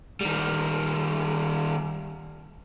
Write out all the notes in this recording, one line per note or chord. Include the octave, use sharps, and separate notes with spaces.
D#3 G3